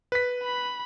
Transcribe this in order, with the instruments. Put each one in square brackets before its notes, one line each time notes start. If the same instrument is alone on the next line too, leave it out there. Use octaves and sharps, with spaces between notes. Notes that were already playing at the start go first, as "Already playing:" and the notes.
[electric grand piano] B4 B6
[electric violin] B5